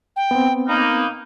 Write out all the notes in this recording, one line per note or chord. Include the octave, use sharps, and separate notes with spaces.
G5
B3 C4
A#3 D#4 B5